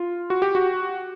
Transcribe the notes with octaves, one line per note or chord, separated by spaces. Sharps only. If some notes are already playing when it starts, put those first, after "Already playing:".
Already playing: F4
F#4
G4
F#4